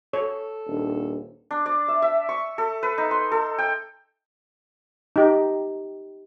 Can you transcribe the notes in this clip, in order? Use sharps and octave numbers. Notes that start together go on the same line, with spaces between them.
A4 C#5
D#1 D4
D4
D5
E5
E5
C#6
A4
B4
D#4
C6
A4
G5
D#4 G4